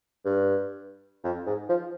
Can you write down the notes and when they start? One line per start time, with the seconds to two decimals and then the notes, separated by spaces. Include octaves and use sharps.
0.25 G2
1.24 F2
1.47 G#2
1.69 F3